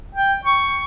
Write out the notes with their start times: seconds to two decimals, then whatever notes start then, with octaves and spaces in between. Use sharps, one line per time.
0.15 G5
0.45 C#6